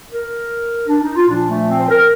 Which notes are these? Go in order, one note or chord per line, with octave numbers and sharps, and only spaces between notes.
A#4
D4
D#4
F4
A#2 F3 D4
A3
C4
C5
A#4